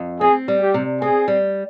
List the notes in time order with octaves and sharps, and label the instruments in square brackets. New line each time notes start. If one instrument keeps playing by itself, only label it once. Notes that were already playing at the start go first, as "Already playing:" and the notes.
Already playing: [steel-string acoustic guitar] F2
[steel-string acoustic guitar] C4 [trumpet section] G#4
[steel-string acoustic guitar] G3
[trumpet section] G4
[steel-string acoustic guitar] C3
[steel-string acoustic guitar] C4 [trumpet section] G#4
[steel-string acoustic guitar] G3